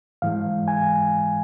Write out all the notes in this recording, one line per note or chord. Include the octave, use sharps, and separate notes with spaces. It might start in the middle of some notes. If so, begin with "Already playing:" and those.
G#2 E3 G#3 F5
G#5